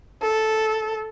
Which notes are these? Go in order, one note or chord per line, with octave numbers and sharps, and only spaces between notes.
A4